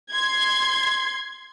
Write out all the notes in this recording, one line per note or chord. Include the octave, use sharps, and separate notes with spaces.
C6 G#6